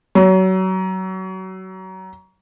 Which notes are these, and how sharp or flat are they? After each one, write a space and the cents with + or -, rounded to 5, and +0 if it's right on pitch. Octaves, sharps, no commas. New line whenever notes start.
F#3 +25